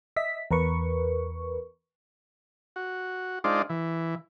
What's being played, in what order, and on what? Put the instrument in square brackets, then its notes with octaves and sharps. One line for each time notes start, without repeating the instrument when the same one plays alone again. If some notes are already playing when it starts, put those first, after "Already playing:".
[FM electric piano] D#5 E5 B6
E2 A#4 B4 C#6
[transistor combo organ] F#4
G#3 D4 D#4 F4 C5 D5
E3